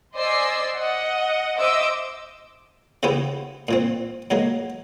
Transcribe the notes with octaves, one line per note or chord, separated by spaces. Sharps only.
C5 D5 D#5 G#5 E6 C7
D#5 F#5
C5 D#5 E5 D6 E6
C#3 E3 B3 E4 G4
A#2 E3 C4
B2 F#3 G#3 A#3